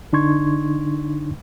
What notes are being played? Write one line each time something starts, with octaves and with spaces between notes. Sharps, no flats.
D3 D4 D#4 C6 C#6 G#6